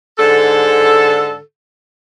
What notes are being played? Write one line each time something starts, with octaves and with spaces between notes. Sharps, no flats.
G#2 D3 A4